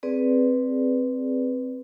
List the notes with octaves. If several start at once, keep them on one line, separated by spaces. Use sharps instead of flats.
C4 G#4 B4 D5